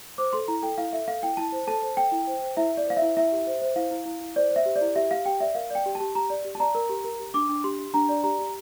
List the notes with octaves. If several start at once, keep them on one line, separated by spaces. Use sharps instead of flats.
C5 D6
A4 C6
E4 A#5
A4 G5
E4 F5
A4 E5
A4 F5
E4 G5
E4 A5
C5
A4 A5
C5
A4 G5
E4
C5
C5
E4 E5
E4
D5
C5 F5
E5
E4
E4 E5
G4
C5
C5
E4 F5
E4
E4
E4
C5 D5
C5
E5
G4
D5
E4
G4 E5
G4 F5
G4 G5
D5 E5
A#4 F5
D5 G5
G4
A5
G4
G4 A#5
D5
G4
A5
D5 A#5
A#4
G4
A#4
G4
D4 D6
D4
G4 C6
G4
D4 A#5
D5
G4 A#5
G4